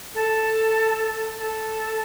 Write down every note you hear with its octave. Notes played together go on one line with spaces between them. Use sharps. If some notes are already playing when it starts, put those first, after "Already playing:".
A4
A4